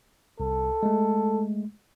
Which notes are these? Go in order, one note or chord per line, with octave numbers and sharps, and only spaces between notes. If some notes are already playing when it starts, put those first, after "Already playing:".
C2 A4
G#3 A3